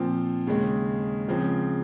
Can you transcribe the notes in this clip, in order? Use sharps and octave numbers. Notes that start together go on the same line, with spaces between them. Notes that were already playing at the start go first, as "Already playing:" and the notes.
Already playing: A#2 F3 C4
D#2 C#3 G#3
C#2 C#3 F3 C4